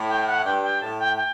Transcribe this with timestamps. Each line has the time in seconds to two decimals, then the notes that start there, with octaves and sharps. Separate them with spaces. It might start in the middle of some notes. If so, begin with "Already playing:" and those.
Already playing: A2
0.08 G5
0.26 F#5
0.44 G2 G5
0.63 G5
0.81 A2 A5
0.99 G5
1.16 G5